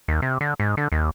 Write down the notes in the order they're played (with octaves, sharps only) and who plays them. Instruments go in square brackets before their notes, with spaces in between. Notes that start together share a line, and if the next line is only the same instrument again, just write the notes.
[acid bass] D#2
C3
D3
G#2
D3
D#2